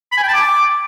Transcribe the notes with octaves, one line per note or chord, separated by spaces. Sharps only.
B5
G#5
G5
A5
D6